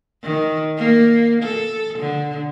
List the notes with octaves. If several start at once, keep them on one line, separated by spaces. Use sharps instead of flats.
D#3
A#3
A4
D3